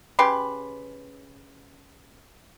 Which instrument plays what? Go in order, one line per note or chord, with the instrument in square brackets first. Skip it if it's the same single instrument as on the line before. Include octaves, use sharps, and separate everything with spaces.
[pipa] C#3 G4 B4 C6